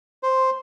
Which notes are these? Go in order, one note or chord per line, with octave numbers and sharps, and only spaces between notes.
C5